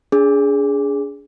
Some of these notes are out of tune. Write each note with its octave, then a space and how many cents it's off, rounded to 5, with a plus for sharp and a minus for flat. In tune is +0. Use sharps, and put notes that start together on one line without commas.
D4 -40 G#4 -5